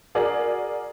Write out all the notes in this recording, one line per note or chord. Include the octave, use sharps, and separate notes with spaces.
F#4 G#4 A#4 D5